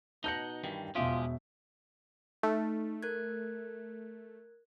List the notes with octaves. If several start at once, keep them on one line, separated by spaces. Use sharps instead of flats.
B2 D#4 F#5 A5 G6 A#6
G2 D#3 E3
E1 B2 F3 G#3 F4 G4 E5
A3 D#4
A#4 F#6 G#6